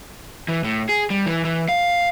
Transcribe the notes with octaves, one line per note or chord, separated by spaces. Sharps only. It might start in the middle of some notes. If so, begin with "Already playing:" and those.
E3
A2
G#4
G3
E3
E3
F5